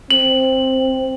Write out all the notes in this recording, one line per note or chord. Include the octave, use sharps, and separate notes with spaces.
C4 F#7